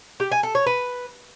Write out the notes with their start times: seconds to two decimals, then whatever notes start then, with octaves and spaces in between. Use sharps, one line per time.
0.20 G4
0.31 G#5
0.43 A4
0.55 C#5
0.66 B4